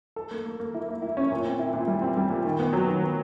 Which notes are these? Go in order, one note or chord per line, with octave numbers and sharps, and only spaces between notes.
A4
A#3
A#3
A#3
E4
A#3
E4
C#4
A#2
C4
E4
A#2
G3
C4
G3
A#2
D#3
B3
F#3
D#3
B3